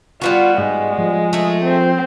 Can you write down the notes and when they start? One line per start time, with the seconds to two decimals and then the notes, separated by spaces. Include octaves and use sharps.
0.21 G3 B3 F4 F#4 F#5
0.58 G#2 G#3
0.98 F3
1.33 A3 G#4
1.64 C4